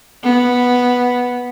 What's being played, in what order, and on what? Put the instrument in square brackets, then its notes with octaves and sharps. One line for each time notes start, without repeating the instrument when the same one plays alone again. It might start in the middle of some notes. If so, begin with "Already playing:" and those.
[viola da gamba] B3